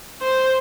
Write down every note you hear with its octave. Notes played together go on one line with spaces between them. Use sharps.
C5